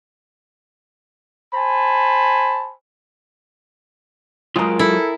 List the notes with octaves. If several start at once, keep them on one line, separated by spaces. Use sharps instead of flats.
C5 G#5 A5 B5
F#3 G#3 F4 G#4 A#4
E4 A4